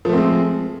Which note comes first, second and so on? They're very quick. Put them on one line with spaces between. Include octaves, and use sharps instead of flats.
F3 A3 C4 G#3